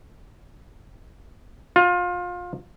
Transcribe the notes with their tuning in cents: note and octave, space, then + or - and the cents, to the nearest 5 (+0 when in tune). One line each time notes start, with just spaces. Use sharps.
F4 +25